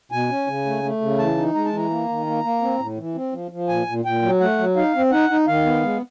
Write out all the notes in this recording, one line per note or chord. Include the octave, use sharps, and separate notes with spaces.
B2 G#5
C#4
C#3
A3
A3
C#3
E3 A5
D#4
G#3 A#5
A5
E3 A#5
A#3
D#3
A#3
A#3
C4
A2
E3
C4
F3
F3
A#2 G#5
A#2
A#2 G5
F#3
A3 F#5
F#3
D#4 F5
C4
D#4 F#5
D#4
D#3 F5
B3
G#3